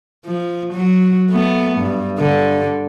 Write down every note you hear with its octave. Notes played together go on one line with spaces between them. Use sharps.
F3
F#3
A3 B3
G2
G2 D3